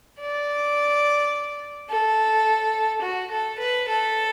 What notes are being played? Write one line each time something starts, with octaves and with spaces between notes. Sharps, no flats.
D5
A4
F#4
A4
B4
A4